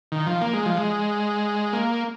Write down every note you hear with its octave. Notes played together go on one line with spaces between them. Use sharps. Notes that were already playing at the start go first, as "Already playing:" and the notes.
D#3
F3
A#3
G#3
F3
G#3
A#3